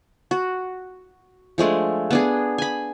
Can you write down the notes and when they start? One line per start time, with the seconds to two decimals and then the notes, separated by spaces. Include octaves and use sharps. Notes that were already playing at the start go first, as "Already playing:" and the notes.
0.31 F#4
1.58 F3 G#3 A3 D4
2.11 B3 D4 G#4
2.58 G#5 B5